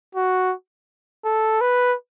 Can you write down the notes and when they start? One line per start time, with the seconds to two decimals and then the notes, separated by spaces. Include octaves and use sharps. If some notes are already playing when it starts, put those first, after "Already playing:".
0.15 F#4
1.25 A4
1.61 B4